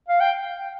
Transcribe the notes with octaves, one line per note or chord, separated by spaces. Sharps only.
F5
G5